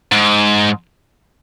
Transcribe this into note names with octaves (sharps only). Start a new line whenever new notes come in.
G#2